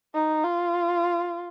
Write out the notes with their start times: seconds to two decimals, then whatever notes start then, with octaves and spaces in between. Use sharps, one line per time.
0.14 D#4
0.44 F4